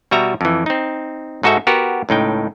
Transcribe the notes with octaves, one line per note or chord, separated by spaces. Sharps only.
B2 G3 F#4 E5 A#5
F2 E3
C4 D#4
G#2 D#4 F#4 A4 E5
B3 F#4 G4 A#4
C#2 A2 D#4 G5